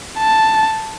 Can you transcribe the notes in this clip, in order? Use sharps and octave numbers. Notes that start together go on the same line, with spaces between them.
A5